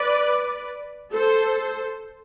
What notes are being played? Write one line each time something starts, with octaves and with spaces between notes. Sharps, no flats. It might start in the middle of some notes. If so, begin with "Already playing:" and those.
Already playing: B4 D5
A4 C5